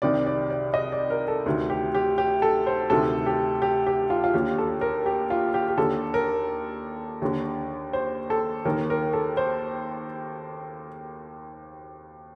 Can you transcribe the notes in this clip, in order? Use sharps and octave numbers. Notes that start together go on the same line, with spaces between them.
C2 C3 D#3 D5
D5
D5
D#5
D5
A#4
A4
D2 C3 D#3
G4
G4
G4
A4
C5
D2 C3 D#3 A4
G4
G4
G4
F4
F4
D#2 D3 G4
A4
A#4
G4
F4
G4
G4
D#2 D3 A4
A#4
D#2 D3
C5
A4
D#2 D#3 A#4
A#4
A4
C5